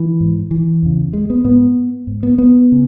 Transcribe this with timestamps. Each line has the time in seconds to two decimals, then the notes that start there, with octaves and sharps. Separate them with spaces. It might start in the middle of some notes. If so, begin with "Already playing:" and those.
Already playing: E3
0.20 G#2
0.51 E3
0.83 E2 C#3
1.13 G#3
1.30 B3
1.44 G#2 B3
2.07 G#2
2.23 B3
2.38 B3
2.72 C#3